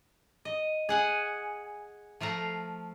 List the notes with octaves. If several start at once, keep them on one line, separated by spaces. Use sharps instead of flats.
D#5
G#4 F#5 G#5
F3 A3 F5 A#5